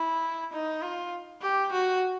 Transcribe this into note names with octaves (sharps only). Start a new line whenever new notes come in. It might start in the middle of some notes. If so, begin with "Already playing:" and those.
Already playing: E4
D#4
F4
G4
F#4